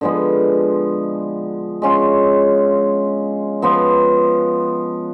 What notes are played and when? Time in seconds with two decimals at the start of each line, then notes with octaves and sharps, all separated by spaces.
0.01 D3 F3 G#3 B3
1.82 G#3 C#4 F4
3.62 F3 B3 F4